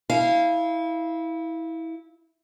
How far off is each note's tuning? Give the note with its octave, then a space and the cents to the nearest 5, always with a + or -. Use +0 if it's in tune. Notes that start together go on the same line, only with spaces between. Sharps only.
E4 -20 F5 -20 G#5 +30